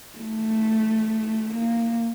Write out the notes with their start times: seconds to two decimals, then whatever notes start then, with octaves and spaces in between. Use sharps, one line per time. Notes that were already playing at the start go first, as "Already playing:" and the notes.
0.19 A3
1.54 A#3